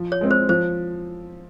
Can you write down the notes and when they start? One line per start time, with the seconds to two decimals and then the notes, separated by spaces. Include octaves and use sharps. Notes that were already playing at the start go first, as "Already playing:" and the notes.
Already playing: F3
0.12 C#5
0.21 G#3 C4
0.31 C5
0.49 F3 C5